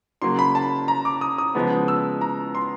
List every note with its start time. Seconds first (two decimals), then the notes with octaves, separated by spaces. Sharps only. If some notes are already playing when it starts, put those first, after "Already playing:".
0.22 C#3 F#3 A#3 C6
0.39 B5
0.55 A5
0.88 A#5
1.05 D6
1.21 D#6
1.38 D#6
1.55 C#3 F3 G#3 B3
1.88 E6
2.21 A#5
2.55 C6